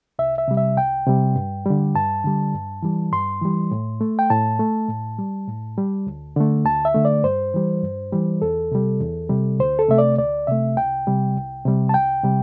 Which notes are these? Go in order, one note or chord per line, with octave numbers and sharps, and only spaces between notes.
C2 E5
E5
C3 G3
E5
C2 G5
C3 G3
G2
D3 G3
G2 A5
D3 G3
G2
E3 G3
G2 C6
E3 G3
A2
A3
G5
A2 A5
A3
A2
G3
A2
G3
D2
D3 A3
D2 A5
E5
D3 A3
D5
G2 C5
E3 G3
G2
E3 G3
E2 A4
C3 G3
E2
C3 G3
D2 C5
A4
C3 A3 E5
D5
D2 D5
C3 A3 E5
C2 G5
C3 G3
C2
C3 G3
A5
C2 G5
C3 G3